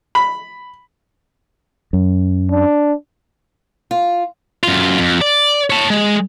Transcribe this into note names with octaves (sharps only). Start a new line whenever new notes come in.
B5
F#2
D4
F4
F#2 F4
F2
D5
C#5 A5
G#3